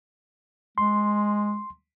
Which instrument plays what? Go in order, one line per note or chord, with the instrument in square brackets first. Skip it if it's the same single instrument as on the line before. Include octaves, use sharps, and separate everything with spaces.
[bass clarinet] G#3 [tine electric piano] C6